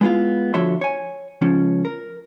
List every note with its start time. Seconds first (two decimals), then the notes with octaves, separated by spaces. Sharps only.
0.01 G#3 B3 E4 F4 F5
0.54 D3 F3 F#4 C#5 E5 C6
0.81 C#5 G#5
1.41 C#2 F3 C#4
1.85 A#4